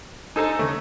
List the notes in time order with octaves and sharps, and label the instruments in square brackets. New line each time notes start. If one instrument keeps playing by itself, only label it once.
[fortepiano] D#4 A4 C5 [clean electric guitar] G#5 A#5
[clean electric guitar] D#2 C#3 [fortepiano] A3